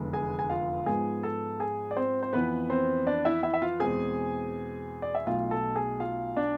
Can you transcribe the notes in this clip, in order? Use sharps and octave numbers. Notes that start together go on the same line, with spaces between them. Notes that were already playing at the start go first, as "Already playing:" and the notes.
Already playing: F1 E2 D3 G#3 B3
G#4 G#5
G#5
F4 F5
G#2 F3 G#3 B3 G#4 G#5
A4 A5
G#4 G#5
D5
C4 C5
C5
F2 E3 B3 B4
C4 C5
D4 D5
E4 E5
E4 E5
E5
F4 F5
E2 B2 G#3 C4 G#4 G#5
D5
E5
B1 B2 A3 F4 F5
A4 A5
G#4 G#5
F4 F5
D4 D5